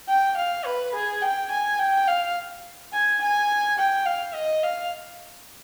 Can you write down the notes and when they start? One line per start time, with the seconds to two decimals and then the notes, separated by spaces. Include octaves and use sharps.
0.08 G5
0.37 F5
0.65 B4
0.94 G#4
1.22 G5
1.51 G#5
1.79 G5
2.08 F5
2.93 G#5
3.21 G#5
3.78 G5
4.06 F5
4.34 D#5
4.63 F5